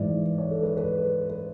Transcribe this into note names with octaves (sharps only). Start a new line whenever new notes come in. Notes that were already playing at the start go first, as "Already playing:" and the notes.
Already playing: G#2 E3 D5
C#5
A4
B4
B4
B4